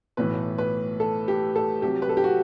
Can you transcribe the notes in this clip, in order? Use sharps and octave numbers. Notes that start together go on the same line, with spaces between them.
B1 A2 E3 B4
B4
A4
G4
A4
C2 C3 F#3 G4
B4
A4
G4
F#4